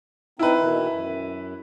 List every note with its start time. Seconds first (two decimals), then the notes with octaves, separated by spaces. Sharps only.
0.39 C4 D#4 E4 B4
0.60 B2 D#3 E3
0.87 F#2